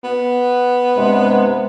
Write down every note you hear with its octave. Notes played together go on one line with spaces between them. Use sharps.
B3
G2 C3 G#3